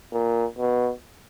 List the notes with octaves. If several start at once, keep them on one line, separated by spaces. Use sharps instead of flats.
A#2
B2